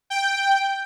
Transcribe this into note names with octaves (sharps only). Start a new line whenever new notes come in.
G5